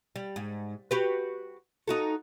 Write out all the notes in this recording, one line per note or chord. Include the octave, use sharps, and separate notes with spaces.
G3
G#2
F#4 G4 B4
D#4 F#4 A4